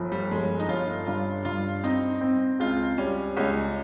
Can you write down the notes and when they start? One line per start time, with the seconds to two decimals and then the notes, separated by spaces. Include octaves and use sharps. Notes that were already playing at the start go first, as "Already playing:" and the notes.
Already playing: G1 F3
0.12 G3
0.31 G1 G#3
0.59 D#4
0.69 G1 F4
1.06 G2 F4
1.45 G2 F4
1.83 C4 D#4
2.21 C4
2.59 C#2 F4
2.98 G3 C#4
3.37 C#2 C#4